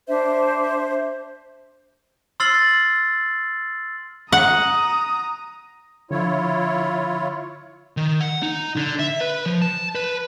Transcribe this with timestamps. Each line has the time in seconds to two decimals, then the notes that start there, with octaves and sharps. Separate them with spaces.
0.07 D4 C5 E5
2.40 C6 E6 F6 A6 C7 F#7
4.32 F#5 A#5 D#6
6.11 D3 F3 E4 F4 C#5
7.97 D#3
8.20 F#5
8.42 D#4
8.76 D3
8.99 E5
9.21 B4
9.46 F3
9.62 A5
9.95 B4